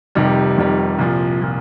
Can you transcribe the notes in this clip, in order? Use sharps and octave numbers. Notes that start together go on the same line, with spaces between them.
F1 F2 C3 D#3 G3
F1 F2 C3 D#3 G3
C2 A#2 F3
A#2 F3